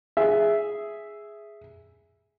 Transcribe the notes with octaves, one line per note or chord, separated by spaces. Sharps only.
G#4 E5